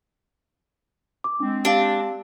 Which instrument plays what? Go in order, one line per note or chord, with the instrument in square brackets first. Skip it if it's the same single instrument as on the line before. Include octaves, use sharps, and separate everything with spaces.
[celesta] D6
[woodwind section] G#3 C4 [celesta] D4
[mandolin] D4 [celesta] G4 F5